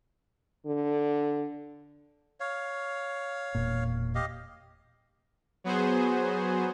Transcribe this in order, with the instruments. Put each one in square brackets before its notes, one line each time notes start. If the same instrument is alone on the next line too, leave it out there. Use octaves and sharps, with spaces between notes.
[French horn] D3
[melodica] C#5 F5
[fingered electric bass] E1 A#2
[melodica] G4 D#5 F5
[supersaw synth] F#3 B3 F#4 G#4 C5